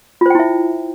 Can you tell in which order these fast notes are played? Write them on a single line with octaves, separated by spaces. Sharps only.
F4 C5 G5 E4 E5